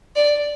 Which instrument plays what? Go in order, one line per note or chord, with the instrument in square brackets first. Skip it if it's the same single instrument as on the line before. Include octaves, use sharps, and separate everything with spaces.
[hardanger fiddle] D5